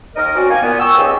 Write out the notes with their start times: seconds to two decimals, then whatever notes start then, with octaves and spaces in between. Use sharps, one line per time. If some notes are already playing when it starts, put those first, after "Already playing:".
0.16 D#2 D#4 A#4 D#5
0.35 C4 C#4 F#4 D5
0.49 A#3 D#4 G#5
0.61 A#2 B3
0.79 G5 G#5 C#6 D#6 E6
0.97 C#2 G#2 C4 G4